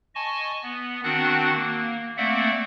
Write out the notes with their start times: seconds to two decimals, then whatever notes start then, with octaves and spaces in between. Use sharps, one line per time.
0.15 D#5 G#5 A5 C#6
0.63 B3
1.04 D#3 C4 D4 F#4 F#5 F#6
1.55 A#3
2.17 A3 A#3 C4 D5 E5 F#5